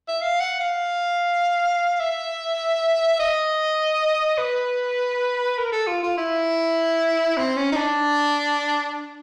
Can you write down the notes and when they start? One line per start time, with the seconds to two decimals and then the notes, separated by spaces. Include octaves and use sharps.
0.08 E5
0.21 F5
0.40 F#5
0.60 F5
2.00 E5
3.19 D#5
4.38 B4
5.58 A#4
5.72 A4
5.87 F4
6.03 F4
6.17 E4
7.37 C4
7.56 C#4
7.72 D#4
7.77 D4